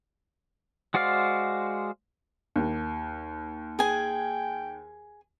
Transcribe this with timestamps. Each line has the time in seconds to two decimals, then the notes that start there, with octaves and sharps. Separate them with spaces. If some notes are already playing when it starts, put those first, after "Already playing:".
0.94 G#3 F#4 C5 D5 F5
2.56 D#2
3.79 G#4 G5 G#5